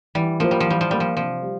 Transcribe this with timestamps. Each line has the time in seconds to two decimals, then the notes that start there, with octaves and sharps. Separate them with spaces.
0.15 E3 G3
0.40 F3 A#3 F4 C5
0.51 G3
0.60 F3
0.66 E3 G3
0.81 F3
0.91 G3 A#3 F4 C5
1.00 F3
1.17 C3 F3
1.42 G3